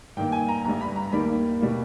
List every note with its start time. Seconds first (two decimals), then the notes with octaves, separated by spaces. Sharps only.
0.17 G2 D#3 A#3 G5
0.32 G#5
0.49 A#5
0.65 G1 G2 G3 A#5
0.81 B5
0.96 A#5
1.12 D#2 D#3 G3 A#3 B5
1.61 B2 G3 A#3